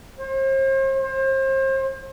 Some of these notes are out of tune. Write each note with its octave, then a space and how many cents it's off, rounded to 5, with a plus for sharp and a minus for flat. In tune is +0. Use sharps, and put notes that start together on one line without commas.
C5 +40
C5 +35